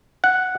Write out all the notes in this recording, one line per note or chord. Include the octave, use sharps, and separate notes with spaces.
F#5